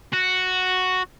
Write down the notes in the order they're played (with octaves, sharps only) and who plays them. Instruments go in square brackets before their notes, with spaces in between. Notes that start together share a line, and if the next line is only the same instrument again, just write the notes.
[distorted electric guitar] F#4